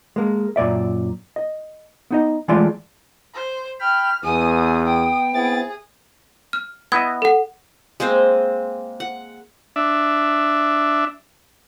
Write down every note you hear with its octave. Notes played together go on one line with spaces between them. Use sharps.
G#3 A#3
F#2 A#2 D5 E5
D#5
B3 D#4 D#5
E3 G#3 A3 F4 D5 C6
C5
G5 B5 F6
E2 B3 G#5 D#6
G5 D#6
B3 C4 E4 G#4 A6
F6
B3 E4 D#5 G#6
A4 F#5
G#3 A#3 C4 C5
F#5
D4 E5